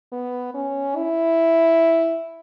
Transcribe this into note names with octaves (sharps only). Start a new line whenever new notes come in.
B3
C#4
E4